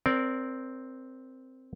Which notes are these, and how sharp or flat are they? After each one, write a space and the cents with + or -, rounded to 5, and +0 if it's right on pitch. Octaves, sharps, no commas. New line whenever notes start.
C4 +0 A#4 +0 D5 -20